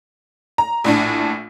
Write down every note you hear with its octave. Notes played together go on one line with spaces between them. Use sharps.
A#5
A#1 A2 D4